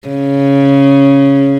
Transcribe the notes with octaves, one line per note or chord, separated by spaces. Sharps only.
C#3